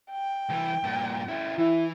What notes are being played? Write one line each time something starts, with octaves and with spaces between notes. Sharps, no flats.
G5
C2 E3
G2 A#2
C#4 E4
E3 E4